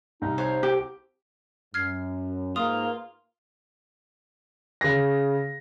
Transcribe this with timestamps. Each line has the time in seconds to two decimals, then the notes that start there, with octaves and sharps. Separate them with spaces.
0.22 C2 D#4
0.38 C5 C#5
0.63 G4
1.74 F#2 F6 G#6 C7
2.56 G#2 A#3 F4 B4 D#6
4.81 C#3 A#6